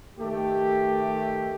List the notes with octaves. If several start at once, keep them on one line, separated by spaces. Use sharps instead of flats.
D#3 A3 G4